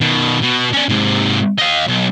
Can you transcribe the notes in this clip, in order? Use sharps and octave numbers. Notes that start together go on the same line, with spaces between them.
B2 D#3
B2
C#4 D5
G#2 C3
D#5 F5
B1